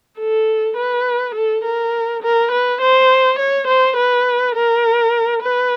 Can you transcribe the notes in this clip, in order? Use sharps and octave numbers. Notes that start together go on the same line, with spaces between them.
A4
B4
A4
A#4
A#4
B4
C5
C#5
C5
B4
A#4
B4